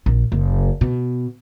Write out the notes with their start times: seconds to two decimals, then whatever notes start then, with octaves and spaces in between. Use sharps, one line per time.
0.06 A#1
0.32 F#1
0.81 B2